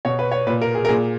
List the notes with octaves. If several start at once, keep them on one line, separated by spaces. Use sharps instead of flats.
B2 C#5
B4
C#5
A#2 B4
A#4
G#4
A#4
A#2 G#4